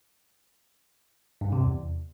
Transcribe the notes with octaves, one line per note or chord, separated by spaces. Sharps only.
G2
C3
E2